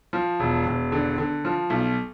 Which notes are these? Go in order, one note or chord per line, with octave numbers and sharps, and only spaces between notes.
F3
E1
E1
D3
D3
F3
B1